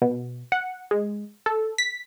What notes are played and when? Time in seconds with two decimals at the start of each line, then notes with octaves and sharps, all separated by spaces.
0.02 B2
0.52 F#5
0.91 G#3
1.46 A4
1.78 B6